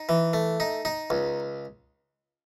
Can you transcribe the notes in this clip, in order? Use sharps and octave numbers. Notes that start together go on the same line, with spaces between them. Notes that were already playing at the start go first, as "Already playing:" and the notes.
Already playing: D#4
E3
A3
D#4
D#4
C#2